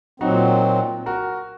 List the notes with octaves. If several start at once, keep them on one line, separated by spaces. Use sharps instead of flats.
A#2 F#3 C4 D#4 F#4
F#4 A#4